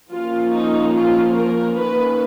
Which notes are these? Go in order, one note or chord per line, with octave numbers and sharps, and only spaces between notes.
F3 A#3 C#4 F4
D#4
F4
A#4
D#3 A#3 C#4 B4